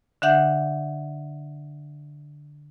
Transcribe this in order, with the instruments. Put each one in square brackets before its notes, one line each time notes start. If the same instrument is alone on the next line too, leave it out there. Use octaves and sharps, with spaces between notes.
[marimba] D3 D4 E5 F#5 G6